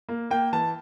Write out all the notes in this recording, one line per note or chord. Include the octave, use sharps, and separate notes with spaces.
A#3
A#3 G5
E3 A5